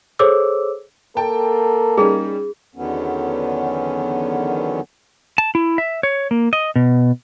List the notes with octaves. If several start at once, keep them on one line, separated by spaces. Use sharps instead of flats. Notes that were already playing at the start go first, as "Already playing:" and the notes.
G#4 A4 C5 C#5 D6 E6
A#3 A4 G5 A5
G3 C#4 D#4 G#4
E2 D3 D#3 F#3 B3 C#4
A5
E4
E5
C#5
A#3
D#5
B2